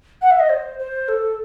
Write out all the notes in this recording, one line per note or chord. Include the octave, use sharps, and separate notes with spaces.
F#5
E5
D#5
C5
C5
A4